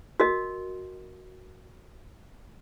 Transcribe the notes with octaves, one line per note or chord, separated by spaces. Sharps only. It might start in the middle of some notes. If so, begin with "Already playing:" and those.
F#4 A#4 D#5